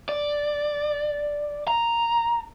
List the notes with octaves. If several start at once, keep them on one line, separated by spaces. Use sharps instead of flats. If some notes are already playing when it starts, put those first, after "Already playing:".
D5
A#5